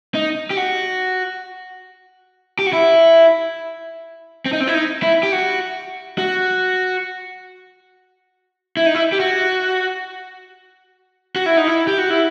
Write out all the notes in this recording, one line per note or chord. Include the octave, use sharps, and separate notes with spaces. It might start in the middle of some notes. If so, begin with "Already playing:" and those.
D#4
G4
F#4
G4
F#4
E4
C4
D#4
C4
E4
D#4
E4
G4
F#4
F#4
E4
D#4
E4
G4
F#4
F#4
E4
D#4
E4
G4
F#4
E4